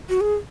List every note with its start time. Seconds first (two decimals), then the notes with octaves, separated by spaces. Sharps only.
0.09 F#4
0.21 G#4